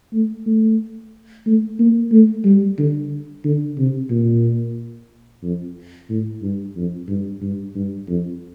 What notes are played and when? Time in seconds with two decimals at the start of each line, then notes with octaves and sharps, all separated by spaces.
0.13 A3
0.46 A3
1.46 A3
1.79 A#3
2.12 A3
2.45 G3
2.78 D3
3.45 D3
3.78 C3
4.10 A#2
5.43 F2
6.10 A2
6.42 G2
6.76 F2
7.08 G2
7.41 G2
7.75 G2
8.08 F2